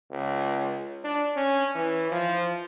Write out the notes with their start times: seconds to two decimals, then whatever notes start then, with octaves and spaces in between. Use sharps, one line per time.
0.11 C#2
1.04 D4
1.36 C#4
1.75 E3
2.12 F3